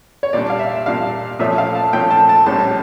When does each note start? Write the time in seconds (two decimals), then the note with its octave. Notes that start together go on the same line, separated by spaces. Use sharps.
0.23 C#5
0.33 A#2 G3 D4 D5
0.50 F5
0.59 E5
0.86 A#2 G3 D4 F5
1.39 A#2 F3 A3 C#4 E5
1.58 F5
1.75 A5
1.93 A#2 F3 A3 C#4 G5
2.11 A5
2.29 A5
2.46 A#1 A2 G3 C#4 A5